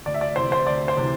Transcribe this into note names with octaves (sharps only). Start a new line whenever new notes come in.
D2 D5
E5
D5
C3 E3 C5
C5
D2 D5
C5
C3 E3